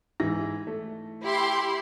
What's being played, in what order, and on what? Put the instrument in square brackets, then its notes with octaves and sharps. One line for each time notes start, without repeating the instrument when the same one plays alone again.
[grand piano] G#2 E3 A#6
A3
[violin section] E4 G4 C6